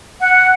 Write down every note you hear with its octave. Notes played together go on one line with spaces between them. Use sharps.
F#5